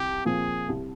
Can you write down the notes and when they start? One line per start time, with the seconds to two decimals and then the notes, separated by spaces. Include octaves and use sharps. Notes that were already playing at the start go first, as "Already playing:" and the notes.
Already playing: C2 G4
0.25 A#2 F3 C4 G#4
0.69 C2